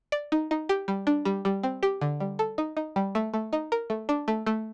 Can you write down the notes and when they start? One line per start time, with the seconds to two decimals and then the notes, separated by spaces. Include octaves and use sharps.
0.12 D5
0.32 D#4
0.51 D#4
0.69 G4
0.88 G3
1.07 D4
1.25 G3
1.45 G3
1.63 C4
1.83 G4
2.01 D3
2.20 G3
2.39 A4
2.58 D#4
2.77 D#4
2.96 G3
3.15 A3
3.34 A3
3.53 D#4
3.72 A#4
3.90 A3
4.09 D4
4.28 A3
4.47 A3